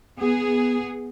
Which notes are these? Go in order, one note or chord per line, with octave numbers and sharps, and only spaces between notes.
B3 G#4